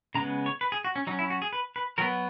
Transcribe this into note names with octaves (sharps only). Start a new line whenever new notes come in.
C#3 G#3 B3 A#5
C#5
B4
G#4
F#4
C#4
F#3 C#4 D#4
E4
F#4
G#4
B4
B4
F#3 B3 A#4